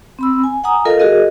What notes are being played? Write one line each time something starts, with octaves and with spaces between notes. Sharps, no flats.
C4 B5 E6
G#5
F#5 G#5 A#5 D#6
F4 A4 A#4 D#5 F5
F#4 G#4 A#4 D#5